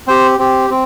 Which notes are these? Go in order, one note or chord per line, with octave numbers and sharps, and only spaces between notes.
C4 G4 C5
C4 G4
C4